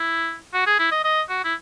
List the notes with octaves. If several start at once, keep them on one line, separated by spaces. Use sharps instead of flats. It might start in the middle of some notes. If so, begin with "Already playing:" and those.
Already playing: E4
F#4
G#4
E4
D#5
D#5
F#4
E4